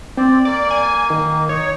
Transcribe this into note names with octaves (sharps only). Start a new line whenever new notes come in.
C4 D5
A#3 D5
G#5
D#3
D#4 C#5